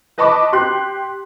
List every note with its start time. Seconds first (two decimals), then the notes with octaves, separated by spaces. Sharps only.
0.18 B4 D#5 A5 B5 C#6 D6
0.52 G4 C6 F#6